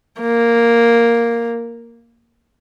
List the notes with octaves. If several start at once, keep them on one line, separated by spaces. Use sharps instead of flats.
A#3